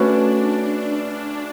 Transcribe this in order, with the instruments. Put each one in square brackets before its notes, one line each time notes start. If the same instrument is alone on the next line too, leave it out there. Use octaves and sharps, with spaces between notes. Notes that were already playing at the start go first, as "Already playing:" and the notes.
Already playing: [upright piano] A3 C#4 F#4 B4 [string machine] D4